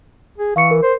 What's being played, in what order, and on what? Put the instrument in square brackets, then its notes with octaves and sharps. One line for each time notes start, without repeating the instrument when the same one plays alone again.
[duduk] G#4
[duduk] E3 [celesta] F5 C#6 C#7
[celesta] A#4
[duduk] C5